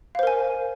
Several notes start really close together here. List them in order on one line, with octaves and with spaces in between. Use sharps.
F5 C5 A#4 G#5